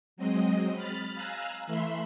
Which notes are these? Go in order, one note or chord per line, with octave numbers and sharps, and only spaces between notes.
F#3 G#3 C4 D#5
B5 F6 A6
F5 G#5 A#5 E6 F#6
E3 A3 E5 B5 C6 B6